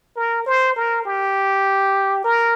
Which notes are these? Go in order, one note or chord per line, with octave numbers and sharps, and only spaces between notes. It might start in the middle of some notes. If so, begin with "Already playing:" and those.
A#4
C5
A#4
G4
A#4